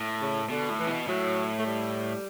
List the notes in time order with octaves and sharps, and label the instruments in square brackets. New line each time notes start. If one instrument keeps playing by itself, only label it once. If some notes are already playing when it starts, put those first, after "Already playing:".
Already playing: [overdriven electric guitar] A2
[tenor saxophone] C#3
[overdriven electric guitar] B2 [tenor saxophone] D3
[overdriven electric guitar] A2
[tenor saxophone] E3
[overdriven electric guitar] B2
[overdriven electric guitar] A2 [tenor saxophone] F#3
[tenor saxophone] A3
G3